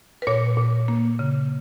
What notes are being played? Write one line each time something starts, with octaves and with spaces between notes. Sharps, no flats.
B4
A#2 A#4 C#5
A#2
A#3
C#3